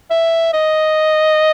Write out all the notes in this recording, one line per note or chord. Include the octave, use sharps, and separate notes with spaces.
E5
D#5